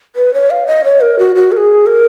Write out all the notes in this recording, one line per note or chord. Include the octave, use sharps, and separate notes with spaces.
B4
C#5
F5
D#5
C#5
A#4
F#4
F#4
A#4
G#4
A#4